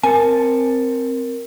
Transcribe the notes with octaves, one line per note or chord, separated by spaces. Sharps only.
C4 A#4 G#5 A5 C#7